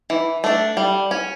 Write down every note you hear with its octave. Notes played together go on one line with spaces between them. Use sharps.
E3
A3 D4
G3
C#4